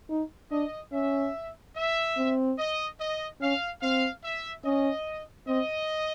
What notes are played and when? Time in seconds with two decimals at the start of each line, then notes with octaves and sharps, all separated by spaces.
0.10 D#4
0.51 D4 D#5
0.92 C#4 E5
1.76 E5
2.17 C4
2.58 D#5
2.99 D#5
3.41 C#4 F5
3.82 C4 F5
4.24 E5
4.65 C#4 D#5
5.48 C4 D#5